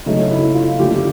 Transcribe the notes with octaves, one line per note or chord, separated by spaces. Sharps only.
C#3 F#3 A3 D#4
E4
F4
D3 F3 A3 G4